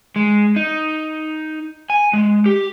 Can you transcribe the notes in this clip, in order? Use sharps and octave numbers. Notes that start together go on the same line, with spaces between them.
G#3
D#4
G#5
G#3
G4